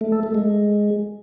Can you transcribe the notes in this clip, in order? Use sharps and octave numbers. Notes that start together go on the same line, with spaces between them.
A3
A4
A3
G#3